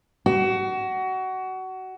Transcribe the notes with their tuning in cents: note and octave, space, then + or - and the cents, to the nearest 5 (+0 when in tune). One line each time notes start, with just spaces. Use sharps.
F#4 +25